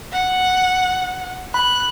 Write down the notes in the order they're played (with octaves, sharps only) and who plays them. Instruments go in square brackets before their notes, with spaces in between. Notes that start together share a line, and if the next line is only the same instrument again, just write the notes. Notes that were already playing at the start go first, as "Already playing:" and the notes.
[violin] F#5
[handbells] B5 [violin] F#6